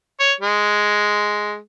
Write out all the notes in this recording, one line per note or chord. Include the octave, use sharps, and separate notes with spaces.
C#5
G#3